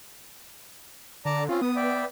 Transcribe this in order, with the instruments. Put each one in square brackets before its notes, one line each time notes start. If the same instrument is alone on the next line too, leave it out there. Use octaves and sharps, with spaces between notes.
[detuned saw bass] D3 [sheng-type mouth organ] D5 A5 A#5
[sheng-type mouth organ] C4 C#4 [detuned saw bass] F4
[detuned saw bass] B3 [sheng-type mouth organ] D#6
[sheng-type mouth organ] D5 E5 G5